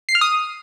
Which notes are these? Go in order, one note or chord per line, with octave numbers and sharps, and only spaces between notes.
C7
F6
D#6